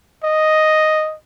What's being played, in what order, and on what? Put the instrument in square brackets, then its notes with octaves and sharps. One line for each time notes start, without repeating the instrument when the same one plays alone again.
[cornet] D#5